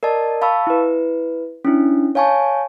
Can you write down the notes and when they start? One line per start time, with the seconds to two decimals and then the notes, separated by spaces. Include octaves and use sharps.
0.03 A#4 D5 D#5 A5
0.42 F5 A5 B5 C#6 E6
0.67 E4 B4
1.65 C#4 D4 E4
2.15 C#5 F5 G#5 A5 C#6